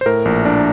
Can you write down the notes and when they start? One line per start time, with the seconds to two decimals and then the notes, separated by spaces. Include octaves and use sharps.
0.01 C5
0.06 A2 A#4
0.25 A#1
0.45 D4